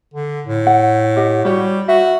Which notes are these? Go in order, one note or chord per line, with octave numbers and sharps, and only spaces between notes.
D3
A2
F#5
G4 D#5 F#5
G3 F#4 C#5
F#4 E5